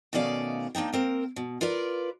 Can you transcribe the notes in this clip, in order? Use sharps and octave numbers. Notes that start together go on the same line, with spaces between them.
B2 D#3 A3 C#4 D5 F5
A#3 D4 D#4 G5
A#3 C4 A#4
B2
F4 A#4 B4 D5